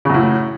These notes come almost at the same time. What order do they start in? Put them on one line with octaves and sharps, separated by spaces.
C#3 F#2 A2